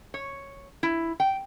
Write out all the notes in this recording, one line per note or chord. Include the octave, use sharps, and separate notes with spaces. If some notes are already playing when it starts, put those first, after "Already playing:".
C#5
E4
G5